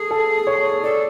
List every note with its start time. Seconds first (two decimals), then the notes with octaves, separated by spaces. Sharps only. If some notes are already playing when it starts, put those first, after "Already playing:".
Already playing: G#4 A4
0.11 A4
0.47 C#5
0.83 A4 D5